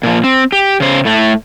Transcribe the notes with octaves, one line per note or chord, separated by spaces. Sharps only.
A#2 F3
C4
G4
C#3 C5
A2 A3